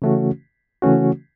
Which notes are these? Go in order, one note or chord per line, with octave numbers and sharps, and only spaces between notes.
C#3 E3 A3 C#4 F#4
C#3 E3 A3 C#4 F#4